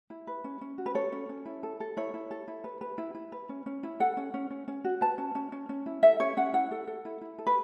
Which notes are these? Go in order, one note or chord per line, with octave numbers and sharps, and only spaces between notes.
E4
B4
C#4
C#4
F#4
B4
A4 C#5
C#4
C#4
E4
A4
A4
E4 C#5
E4
A4
E4
B4
B4
E4
E4
B4
C#4
C#4
E4
A4 F#5
C#4
C#4
C#4
C#4
F#4
B4 A5
C#4
C#4
C#4
C#4
E4
A4 E5
C#4 C#5
C#4 F#5
E4 F#5
A4
A4
E4
E4
A4
B4